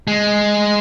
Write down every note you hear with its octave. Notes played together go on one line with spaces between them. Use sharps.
G#3